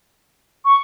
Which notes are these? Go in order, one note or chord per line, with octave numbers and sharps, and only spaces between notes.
C#6